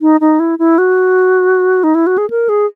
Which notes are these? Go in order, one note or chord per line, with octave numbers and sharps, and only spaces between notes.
D#4
D#4
E4
E4
F#4
D#4
E4
F#4
G#4
A#4
G#4